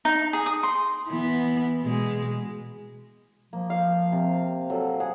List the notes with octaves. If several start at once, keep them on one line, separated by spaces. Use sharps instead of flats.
D#4
G#4
D#6
C6
E3 B3
B2 G#3
F3 A#3
F5
C3
F#3 A4
G#4 F#5